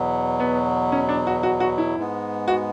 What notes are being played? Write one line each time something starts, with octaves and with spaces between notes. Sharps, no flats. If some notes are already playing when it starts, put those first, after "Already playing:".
Already playing: E2 B2 F#3
B3
C#4
D4
F#4
F#4
F#4
E4
G#2 G#3 B3
F#4